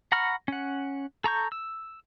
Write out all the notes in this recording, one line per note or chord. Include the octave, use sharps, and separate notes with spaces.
F#5 A#5 B5 C#6 F6
C#4 F#5
A4 A#5 C#6 G6
E6